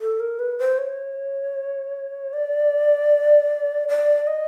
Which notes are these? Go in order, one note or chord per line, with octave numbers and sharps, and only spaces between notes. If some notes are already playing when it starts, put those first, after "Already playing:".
A4
A#4
B4
C5
C#5
D5
D5
D#5